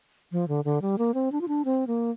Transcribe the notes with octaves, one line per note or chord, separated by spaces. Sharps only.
F3
D3
D3
G3
A#3
C4
D4
F4
D4
C4
A#3